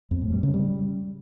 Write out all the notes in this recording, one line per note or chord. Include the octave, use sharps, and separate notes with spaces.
F2
A2
G3
C#3
G3